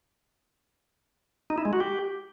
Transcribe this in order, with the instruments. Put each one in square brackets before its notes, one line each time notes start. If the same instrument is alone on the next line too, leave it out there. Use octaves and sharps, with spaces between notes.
[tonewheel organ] D#4
E4
G#3
F#4
G4